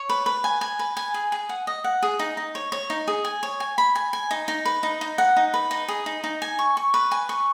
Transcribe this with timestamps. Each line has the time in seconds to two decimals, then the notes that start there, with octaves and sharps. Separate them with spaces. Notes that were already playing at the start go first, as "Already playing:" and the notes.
Already playing: C#5
0.09 B4
0.26 B4
0.44 G#5
0.61 G#5
0.79 B4
0.97 G#5
1.14 G#4
1.32 G#4
1.49 F#5
1.67 D#5
1.84 F#5
2.03 G#4
2.19 D#4
2.37 D#4
2.55 C#5
2.72 C#5
2.90 D#4
3.08 G#4
3.25 G#5
3.43 C#5
3.60 G#5
3.78 B5
3.95 G#5
4.13 G#5
4.31 D#4
4.48 D#4
4.65 B4
4.83 D#4
5.01 D#4
5.18 F#5
5.36 D#4
5.54 B4
5.71 D#4
5.88 G#4
6.06 D#4
6.24 D#4
6.42 G#5
6.59 C#6
6.77 C#6
6.94 B4
7.11 G#5
7.29 C#6